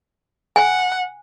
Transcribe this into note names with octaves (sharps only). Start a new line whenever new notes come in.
F#5 G#5